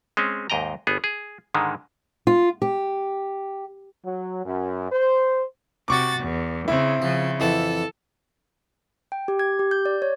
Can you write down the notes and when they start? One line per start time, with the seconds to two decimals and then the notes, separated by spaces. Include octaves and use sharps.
0.17 G#3 C4 C#4
0.50 D#2 G#2 D#5 G5 A#5
0.87 G1 B3 G#4
1.04 G#4
1.54 G#2 D3 D#3 G#3
2.27 F4
2.62 G4
4.05 F#3
4.45 F#2
4.91 C5
5.88 C3 F#4 C#6 D6 A6
6.18 E2
6.68 C#3 C4 E4
7.02 C#3 F3
7.40 F2 E3 A4 F#5
9.12 G5
9.28 G4
9.39 G#6
9.59 G4
9.71 G6
9.86 D5
10.02 C#5